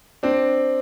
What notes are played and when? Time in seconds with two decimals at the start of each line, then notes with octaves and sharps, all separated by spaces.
0.23 C4 D4